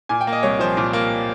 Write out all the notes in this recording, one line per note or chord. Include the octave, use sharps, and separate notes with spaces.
A#2 G#5
G5
A#3
D#5
C2 C#5
F3 C5
A#2
A#3